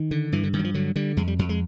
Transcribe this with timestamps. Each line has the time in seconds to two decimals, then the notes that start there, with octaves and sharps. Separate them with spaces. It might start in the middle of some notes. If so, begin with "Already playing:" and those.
Already playing: D#3
0.11 D3
0.32 G2 E3
0.43 D3
0.53 G2 D#3
0.59 F#3
0.64 F3
0.74 D3 F#3
0.96 D3 G3
1.17 F2 G#3
1.27 G3
1.39 F2 F#3
1.49 G#3